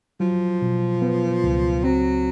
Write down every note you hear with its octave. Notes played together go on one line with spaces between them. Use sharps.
F3 F#3
B2
B3
C#2
F#3 C4